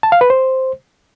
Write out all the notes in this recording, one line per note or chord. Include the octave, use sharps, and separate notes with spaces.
A5
F5
B4
C5